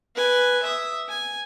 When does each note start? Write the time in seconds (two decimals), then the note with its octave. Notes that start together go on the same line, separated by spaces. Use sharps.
0.15 B4 G#5
0.63 E5 D#6
1.09 G#5